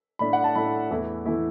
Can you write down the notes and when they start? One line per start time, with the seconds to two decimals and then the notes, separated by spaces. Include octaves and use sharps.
0.19 A2 A3 D4 B5
0.33 F#5
0.44 A5
0.55 A2 A3 D4 B5
0.90 E2 E3 A3 E4
1.26 E3 A3 E4